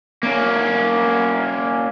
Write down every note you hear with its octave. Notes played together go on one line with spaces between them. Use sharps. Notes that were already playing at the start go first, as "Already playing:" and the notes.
A#3 C#4